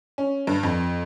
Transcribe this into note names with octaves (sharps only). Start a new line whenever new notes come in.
C#4
G2
F2